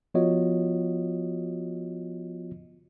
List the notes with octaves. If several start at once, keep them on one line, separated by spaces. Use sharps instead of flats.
F3 B3 F4 F#4 C#5 D#5